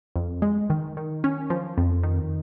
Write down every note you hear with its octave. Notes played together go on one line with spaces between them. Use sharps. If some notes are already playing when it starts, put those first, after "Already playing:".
F2
G#3
D#3
D#3
C#4
F3
F2
D#3